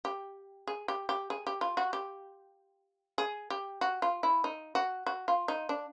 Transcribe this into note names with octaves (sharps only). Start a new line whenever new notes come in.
G4
G#4
G4
G4
G#4
G4
F4
F#4
G4
G#4
G4
F#4
F4
E4
D#4
F#4
F#4
F4
D#4
D4